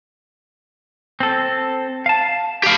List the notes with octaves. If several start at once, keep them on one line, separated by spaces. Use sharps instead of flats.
C4 A4
F5 A5
G4 F5